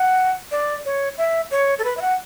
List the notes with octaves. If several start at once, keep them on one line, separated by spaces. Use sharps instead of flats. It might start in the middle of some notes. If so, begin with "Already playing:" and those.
Already playing: F#5
D5
C#5
E5
C#5
A4
B4
E5
F#5